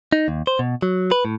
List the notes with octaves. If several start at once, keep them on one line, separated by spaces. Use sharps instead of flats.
D#4
D#2
C5
B2
F#3
B4
A2